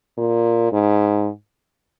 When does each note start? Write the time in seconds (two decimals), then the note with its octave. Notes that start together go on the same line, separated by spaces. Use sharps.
0.18 A#2
0.72 G#2